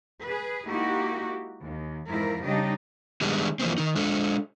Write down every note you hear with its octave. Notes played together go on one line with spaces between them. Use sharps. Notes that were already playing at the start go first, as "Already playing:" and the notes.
G#4 B4
G#3 A#3 D#4 E4 F#4 G4
D#2
F2 G#2 E3 F3 E4 A#4
C#3 G3 D4 D#4 G4 D#5
D#3 G3 G#3 B3 D4
E3 F3 A#3 C4
D#3 D#4
G#3 D4 A4